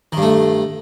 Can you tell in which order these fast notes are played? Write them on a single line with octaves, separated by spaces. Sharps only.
D#3 G2 A3